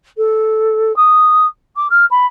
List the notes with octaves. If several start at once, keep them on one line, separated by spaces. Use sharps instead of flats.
A4
D#6
D6
F6
B5